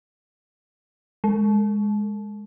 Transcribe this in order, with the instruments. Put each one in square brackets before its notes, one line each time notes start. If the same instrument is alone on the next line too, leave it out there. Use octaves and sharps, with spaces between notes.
[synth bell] G#3